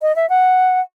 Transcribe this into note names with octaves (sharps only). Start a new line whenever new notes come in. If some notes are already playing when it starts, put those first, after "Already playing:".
D#5
E5
F#5